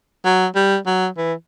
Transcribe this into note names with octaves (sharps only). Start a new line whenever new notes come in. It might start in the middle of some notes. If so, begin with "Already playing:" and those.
F#3
G3
F#3
E3